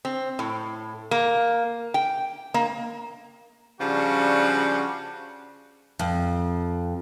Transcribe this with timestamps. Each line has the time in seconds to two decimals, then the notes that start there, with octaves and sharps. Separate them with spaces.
0.05 C4
0.39 A2
1.11 A#3
1.94 G5
2.54 A#3
3.81 C#3 F3 G3 D4 F#4
5.99 F2